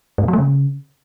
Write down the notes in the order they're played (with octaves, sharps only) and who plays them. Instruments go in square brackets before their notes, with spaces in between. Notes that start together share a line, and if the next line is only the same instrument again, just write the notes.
[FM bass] G#2
A#2
F#3
A3
C#3